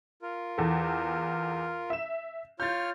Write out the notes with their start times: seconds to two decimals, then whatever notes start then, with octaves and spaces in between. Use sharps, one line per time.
0.22 F4 A#4
0.58 E2 A4
1.90 E5 E7
2.60 F4 C#5 F6 G6 A6